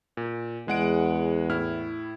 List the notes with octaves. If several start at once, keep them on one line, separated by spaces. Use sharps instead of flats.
A#2
E2 G#3 F#5 D7
A2 E4 F6